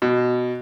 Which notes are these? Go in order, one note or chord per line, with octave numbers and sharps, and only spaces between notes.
B2